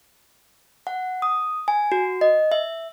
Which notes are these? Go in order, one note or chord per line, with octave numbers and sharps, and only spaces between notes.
F#5
D#6
G#5
F#4
D#5
E5